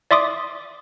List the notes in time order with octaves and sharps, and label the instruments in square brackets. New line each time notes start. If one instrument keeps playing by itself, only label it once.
[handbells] D5 E5 C6 D6 D#6